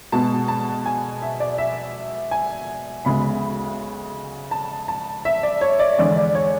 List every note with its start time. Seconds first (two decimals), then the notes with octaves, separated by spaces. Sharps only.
0.12 B2 G#3 B3 A5
0.48 A5
0.86 G#5
1.22 E5
1.40 D5
1.58 E5
2.31 G#5
3.05 D2 C#3 G#3 B3 B5
4.51 A5
4.88 A5
5.25 E5
5.43 D5
5.61 C#5
5.79 D5
5.98 E2 D3 G#3 D5
6.16 D5
6.35 C#5